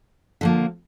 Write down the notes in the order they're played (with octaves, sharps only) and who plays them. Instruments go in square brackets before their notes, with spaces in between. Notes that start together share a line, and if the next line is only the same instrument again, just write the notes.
[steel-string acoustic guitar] D3 F3 A#3